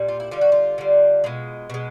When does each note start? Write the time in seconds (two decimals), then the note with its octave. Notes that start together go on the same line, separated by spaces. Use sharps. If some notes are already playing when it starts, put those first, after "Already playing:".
Already playing: A#2 G3
0.08 F4
0.20 E4
0.31 D3 G3 F4
0.41 F#4
0.52 F4
0.78 D3 G3
1.24 B2 G#3
1.70 B2 G#3